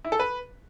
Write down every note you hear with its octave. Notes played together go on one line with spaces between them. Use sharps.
E4
A4
B4